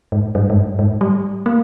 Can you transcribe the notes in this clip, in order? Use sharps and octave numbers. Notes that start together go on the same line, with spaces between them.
G#2
G2
G#2
G2
G#2
G3
A#3